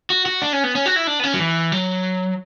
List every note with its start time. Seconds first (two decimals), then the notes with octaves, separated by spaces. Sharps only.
0.10 F#4
0.26 F#4
0.42 D4
0.53 C#4
0.64 B3
0.75 C#4
0.86 F#4
0.96 E4
1.07 D4
1.20 B3
1.24 C#4
1.34 F#3
1.40 E3
1.72 F#3